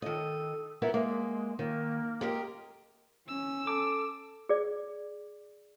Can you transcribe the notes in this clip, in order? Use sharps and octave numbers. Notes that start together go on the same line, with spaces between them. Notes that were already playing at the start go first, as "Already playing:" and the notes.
D#3 A4 D#5
B3 E4 A#4 E5
G#3 A#3
D#3 A#3
G#3 G4 A#4
C#4 E6
A4 D6
G#4 D5